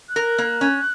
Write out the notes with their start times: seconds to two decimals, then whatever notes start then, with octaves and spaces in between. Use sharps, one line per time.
0.09 F#6
0.16 A#4
0.38 A#3
0.61 C#4